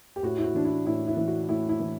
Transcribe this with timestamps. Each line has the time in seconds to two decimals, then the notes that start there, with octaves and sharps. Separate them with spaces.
0.16 G4
0.23 A2 F#4
0.38 E4
0.44 F#4
0.54 E3 D4
0.64 E4
0.86 A2 E4
1.07 E4
1.17 E3
1.28 F#4
1.49 A2 E4
1.69 E4
1.80 E3